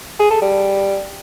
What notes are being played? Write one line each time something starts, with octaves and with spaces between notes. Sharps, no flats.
G#4
A4
G3